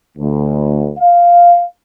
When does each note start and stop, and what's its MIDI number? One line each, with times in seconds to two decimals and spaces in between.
0.18 0.91 38
0.99 1.64 77